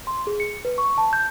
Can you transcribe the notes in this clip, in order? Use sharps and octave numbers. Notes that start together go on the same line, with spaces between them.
C6
G#4
C#7
B4
C#6
A5
G6